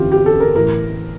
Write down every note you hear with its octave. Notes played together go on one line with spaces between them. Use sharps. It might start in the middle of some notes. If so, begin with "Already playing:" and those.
Already playing: G1 F2 E3 F4 G4
G4
A4
A#4
A2 E3 A#4